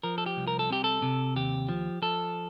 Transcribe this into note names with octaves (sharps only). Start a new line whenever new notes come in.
F3 A#4
A4
G4
C2
A#4
A4
C3 G4
A4
C3
D#2 G4
F3
F3 A4